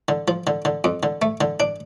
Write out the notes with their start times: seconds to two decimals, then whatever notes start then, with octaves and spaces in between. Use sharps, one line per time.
0.08 D3
0.28 F3
0.47 D3
0.65 D3
0.84 F2
1.03 D3
1.22 A3
1.41 D3
1.60 D4